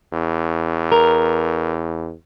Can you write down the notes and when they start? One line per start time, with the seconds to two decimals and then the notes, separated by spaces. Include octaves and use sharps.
0.13 E2
0.92 A#4